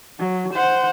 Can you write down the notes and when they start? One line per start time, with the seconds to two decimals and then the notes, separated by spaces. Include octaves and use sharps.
0.20 F#3
0.54 C5 F#5